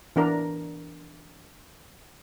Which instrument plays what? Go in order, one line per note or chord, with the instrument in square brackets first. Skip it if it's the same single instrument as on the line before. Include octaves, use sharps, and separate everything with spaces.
[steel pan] E3 D4 A#4